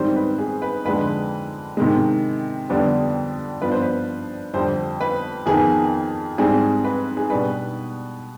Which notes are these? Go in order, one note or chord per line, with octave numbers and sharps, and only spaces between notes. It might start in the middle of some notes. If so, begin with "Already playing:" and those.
Already playing: G#2 D#3 G3 C4 C5
B4
G#4
B4
F2 D3 G#3 B4
C3 D#3 G#3
F2 D3 G3 B3 D4
G2 F3 B3 D4 B4
C5
B4
F2 D3 G3 C5
B4
F2 D#3 B3 G#4
G#2 G3 C4 G#4
B4
G#4
B2 G3 D4 B4